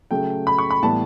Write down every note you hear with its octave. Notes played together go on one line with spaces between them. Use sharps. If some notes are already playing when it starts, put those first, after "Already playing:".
C#3 F#3 A3 G5
B5
C#6
B5
A2 E3 G3 B3 A5